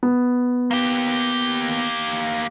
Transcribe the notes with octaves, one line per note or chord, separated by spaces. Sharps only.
B3
A#3 G4